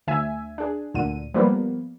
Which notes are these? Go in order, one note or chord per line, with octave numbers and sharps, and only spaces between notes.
D2 E5 G#5
D4 G#4
D2 A#2 D3 D#7
F3 G3 A#3 B3